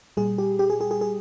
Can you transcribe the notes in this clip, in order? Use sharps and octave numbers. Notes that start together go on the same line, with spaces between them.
A#2 G3 G#4
G4
G4
G#4
G#4
G#4
G#4